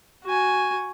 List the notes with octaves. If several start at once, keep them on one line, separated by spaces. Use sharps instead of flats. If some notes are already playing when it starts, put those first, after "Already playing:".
F#4 G#5